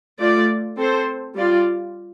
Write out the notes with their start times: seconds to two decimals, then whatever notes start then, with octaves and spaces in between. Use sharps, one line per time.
0.19 A3 F4 D5
0.77 C4 A4 C5
1.35 G3 F4 D5